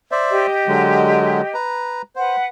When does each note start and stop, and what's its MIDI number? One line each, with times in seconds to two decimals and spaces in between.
0.11 0.46 72
0.11 0.46 74
0.11 0.46 76
0.30 1.53 67
0.30 1.53 75
0.67 1.42 50
0.67 1.42 54
0.67 1.42 56
1.54 2.02 71
1.54 2.02 82
2.16 2.46 71
2.16 2.36 72
2.16 2.46 78